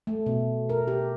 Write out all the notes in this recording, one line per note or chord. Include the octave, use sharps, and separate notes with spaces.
A3
B2
A#4
G4